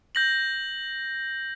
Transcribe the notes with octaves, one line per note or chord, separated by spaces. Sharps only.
G6 A#6 F#7